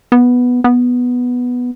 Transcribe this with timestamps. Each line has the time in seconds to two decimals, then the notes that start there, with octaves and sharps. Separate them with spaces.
0.12 B3
0.64 B3